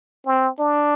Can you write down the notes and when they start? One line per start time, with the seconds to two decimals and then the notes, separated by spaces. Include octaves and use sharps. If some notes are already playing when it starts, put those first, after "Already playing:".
0.26 C4
0.59 D4